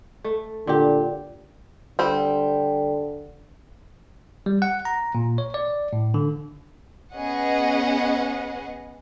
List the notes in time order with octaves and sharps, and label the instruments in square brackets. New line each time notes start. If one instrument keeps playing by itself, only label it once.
[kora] A3
[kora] A#2 G4 [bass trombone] D3
[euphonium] D3 [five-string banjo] G3 C4
[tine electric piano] G3
F#5
A#5
A#2
C#5
D5
A2
D3
[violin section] B3 C#4 G#4 D#5 F#5